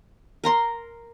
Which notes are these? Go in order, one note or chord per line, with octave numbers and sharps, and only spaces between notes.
A#4 A#5 C6